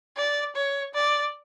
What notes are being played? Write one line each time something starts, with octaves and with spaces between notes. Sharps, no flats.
D5
C#5
D5